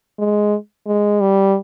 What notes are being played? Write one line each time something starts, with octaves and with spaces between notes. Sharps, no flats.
G#3
G#3
G3